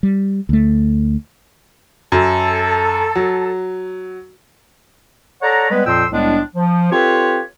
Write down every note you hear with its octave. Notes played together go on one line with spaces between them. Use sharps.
G3
D2 A3
F#2 A4
F#3
A4 C#5 D5 F#5 A#5
G3 G#3 B3 B4
F2 A#2 F3 G5 C6 E6
C2 A2 G#3 B3 D4
F3
C4 F4 G4 A4 B4 C#5